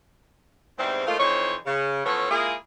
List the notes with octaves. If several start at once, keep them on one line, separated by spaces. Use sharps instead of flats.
E2 G#2 E3 G3 C4
F3 A3 A#3 D#4 F4
F2 E3 D#4 C5 C#5
C#3
E3 F3 B3 C#4 A4 C#5
G#3 A#3 E4 F4 G#4